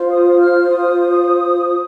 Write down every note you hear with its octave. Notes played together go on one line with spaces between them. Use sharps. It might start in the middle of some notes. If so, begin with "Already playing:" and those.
Already playing: F4 C5
D#6
F6
D#6